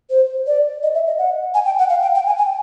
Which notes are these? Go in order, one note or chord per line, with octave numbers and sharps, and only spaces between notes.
C5
D5
D#5
E5
D#5
F#5
G#5
G5
F#5
F5
G5
G5
G#5
G#5